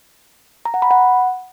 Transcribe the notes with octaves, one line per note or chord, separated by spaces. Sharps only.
A#5
F#5
B5
F#5